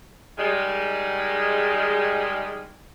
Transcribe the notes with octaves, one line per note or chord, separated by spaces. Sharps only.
D#3 G3 G#3